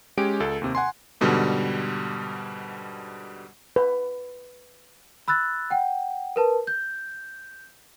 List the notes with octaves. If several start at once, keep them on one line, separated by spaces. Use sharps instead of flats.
G#3 C#4 G4 G#5 D7
C#2 A4
D#2 C3
F#5 G#5 C6
G#2 B2 D3 G3
B4
B5 E6 F#6 A6
F#5 G5
A#4 B4 A5
G6